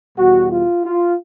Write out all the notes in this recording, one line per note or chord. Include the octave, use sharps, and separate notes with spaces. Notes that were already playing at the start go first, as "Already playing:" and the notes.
E2 B2 G3 F#4
F4
F4